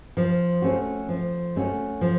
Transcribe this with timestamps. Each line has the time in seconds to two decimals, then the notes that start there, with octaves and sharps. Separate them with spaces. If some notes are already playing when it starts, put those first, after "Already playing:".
0.17 F3
0.62 A3 C#4 F#4
1.08 F3
1.56 A3 C#4 F#4
2.01 F3